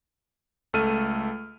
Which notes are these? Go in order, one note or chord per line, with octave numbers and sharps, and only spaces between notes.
C#2 A3 A4 F6 D#7